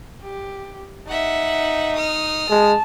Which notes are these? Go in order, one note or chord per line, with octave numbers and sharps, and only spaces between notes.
G4
D#4 E5 F#5
D#6 F6
G#3 A5